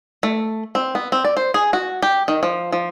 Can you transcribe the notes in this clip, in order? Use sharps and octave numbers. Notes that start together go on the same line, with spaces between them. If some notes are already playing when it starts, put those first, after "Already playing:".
A3
C4
B3
C4
D5
C5
G#4
F#4
G4
D#3
F3
F3